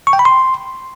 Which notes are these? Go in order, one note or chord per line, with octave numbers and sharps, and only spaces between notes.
C#6
G5
B5
C6